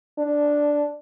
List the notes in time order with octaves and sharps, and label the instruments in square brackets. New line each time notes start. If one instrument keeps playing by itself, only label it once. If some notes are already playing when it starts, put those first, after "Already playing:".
[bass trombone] D4